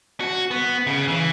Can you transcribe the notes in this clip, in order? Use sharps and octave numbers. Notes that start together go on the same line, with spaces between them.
F#4
B3
C#3
E3